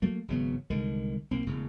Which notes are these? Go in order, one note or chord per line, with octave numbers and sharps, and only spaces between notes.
F#3 A3 A#3
G#1 C#3 F#3 B3
C2 D3 D#3 G#3
B1 A#3 C4
E1 A2 C#3